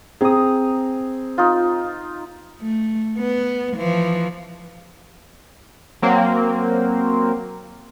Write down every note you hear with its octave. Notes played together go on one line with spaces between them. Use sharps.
C4 G#4 A#5 D#6
D#4 F4
A3
B3
E3 F3
F#3 A#3 C4